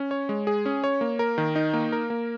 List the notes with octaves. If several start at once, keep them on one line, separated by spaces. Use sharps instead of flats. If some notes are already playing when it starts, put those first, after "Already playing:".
Already playing: C#4
C#5
G#3
G#4
C#4
C#5
A#3
A#4
D#3
D#4
A#3
A#4
A#3